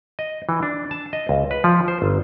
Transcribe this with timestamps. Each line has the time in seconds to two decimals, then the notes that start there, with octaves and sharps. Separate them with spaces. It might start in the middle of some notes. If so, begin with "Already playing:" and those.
0.19 D#5
0.49 E3
0.63 D4
0.91 A5
1.13 D#5
1.29 C#2
1.51 B4
1.64 F3
1.88 C5
2.02 G1